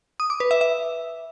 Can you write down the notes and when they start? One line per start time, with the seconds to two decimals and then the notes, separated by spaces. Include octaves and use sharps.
0.20 D#6
0.30 D6
0.40 B4
0.51 E5
0.61 E5